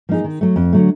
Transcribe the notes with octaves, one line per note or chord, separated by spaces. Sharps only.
F3 A#3 D#4 G#4
D#3
F#3 A3
F2
D3 F#3 A3